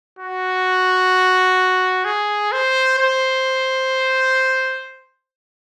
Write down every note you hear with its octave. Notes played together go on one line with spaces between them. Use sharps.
F#4
G#4
C5
C5